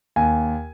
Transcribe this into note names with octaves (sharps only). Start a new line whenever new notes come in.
D#2 G#5